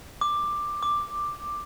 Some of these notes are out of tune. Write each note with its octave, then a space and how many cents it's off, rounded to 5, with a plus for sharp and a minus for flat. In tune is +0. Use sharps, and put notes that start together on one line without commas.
D6 +10
D6 +5